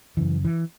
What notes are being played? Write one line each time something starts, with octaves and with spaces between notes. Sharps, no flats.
F#2 C#3 E3
E3